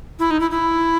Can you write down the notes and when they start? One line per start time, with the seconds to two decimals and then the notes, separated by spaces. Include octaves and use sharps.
0.19 E4
0.31 D#4
0.40 E4
0.51 E4